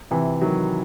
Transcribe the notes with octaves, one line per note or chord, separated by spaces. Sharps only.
C3 E3
D#3 F#3